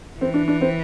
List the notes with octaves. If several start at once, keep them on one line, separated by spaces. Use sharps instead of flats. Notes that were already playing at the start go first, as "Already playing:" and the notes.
E3 C4
D4
D4
C4